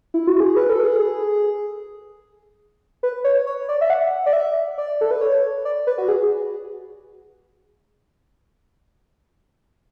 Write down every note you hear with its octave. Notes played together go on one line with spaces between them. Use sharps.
E4
F#4
G#4
B4
A4
G#4
B4
C#5
C#5
D5
E5
F#5
D5
E5
D5
A4
B4
C#5
D5
B4
F#4
G#4